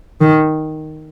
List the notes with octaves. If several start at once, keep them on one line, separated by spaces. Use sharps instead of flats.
D#3